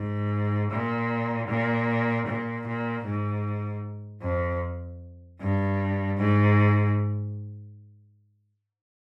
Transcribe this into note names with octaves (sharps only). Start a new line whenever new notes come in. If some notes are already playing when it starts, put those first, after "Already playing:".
Already playing: G#2
A#2
A#2
A#2
A#2
G#2
F2
G2
G#2